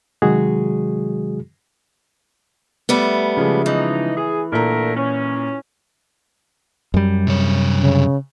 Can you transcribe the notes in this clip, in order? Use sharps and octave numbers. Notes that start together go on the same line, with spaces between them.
C3 D#3 F#3 G#3 F#4 G#4
G3 A3 B3
C#3 F3 G#3
E3 D#4
G#4
A#2 D3 A3 A#4 A#5
C#4
F#2 G3
C3 C#5
C#3